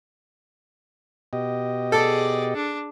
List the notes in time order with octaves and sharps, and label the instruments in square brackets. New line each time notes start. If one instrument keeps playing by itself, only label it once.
[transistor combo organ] B2 G4 D#5
[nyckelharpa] G#4 D5 [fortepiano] A4
[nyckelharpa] D4